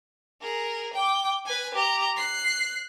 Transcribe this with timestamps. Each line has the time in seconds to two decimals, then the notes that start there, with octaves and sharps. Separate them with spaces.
0.41 G#4 A#4
0.94 G5 D6
1.45 B4 G#5
1.74 G4 A#5
2.16 F#6 C7